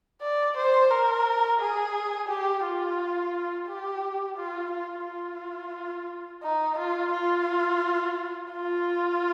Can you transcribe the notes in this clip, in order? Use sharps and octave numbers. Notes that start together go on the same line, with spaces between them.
D5
C5
A#4
G#4
G4
F4
G4
F4
F4
F4
D#4
F4
F4
F4